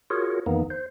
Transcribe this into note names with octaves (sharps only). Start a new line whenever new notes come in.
F4 F#4 G#4 A#4 C#5
F2 D#3 E3 A#3 B3 D#4
C5